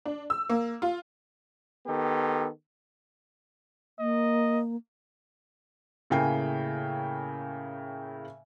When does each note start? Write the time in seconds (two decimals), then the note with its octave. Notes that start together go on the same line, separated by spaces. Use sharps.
0.05 D4
0.30 E6
0.49 A#3
0.82 F4
1.86 D#3 B3 G4 A4
3.99 A#3 D#5
6.10 A2 C#3 A#3 G5 G#5 C7